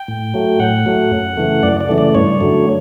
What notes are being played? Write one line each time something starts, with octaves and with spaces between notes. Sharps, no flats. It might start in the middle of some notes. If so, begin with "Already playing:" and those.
Already playing: G5
A2
F#3 A3
A2 F#5
F#3 A3
F#2
C#3 E3 A3
F#2 D5
D5
C#3 E3 A3
D5
G2 C#5
D3 F#3 A3